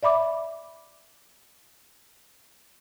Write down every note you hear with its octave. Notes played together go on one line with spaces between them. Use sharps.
D5 E5 B5 D6